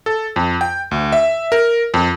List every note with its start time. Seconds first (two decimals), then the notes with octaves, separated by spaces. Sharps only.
0.06 A4
0.36 F2
0.61 G5
0.91 D2
1.12 E5
1.52 A#4
1.94 F2